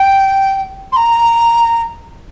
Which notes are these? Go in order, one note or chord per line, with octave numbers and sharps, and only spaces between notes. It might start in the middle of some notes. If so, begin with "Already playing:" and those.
Already playing: G5
C6
A#5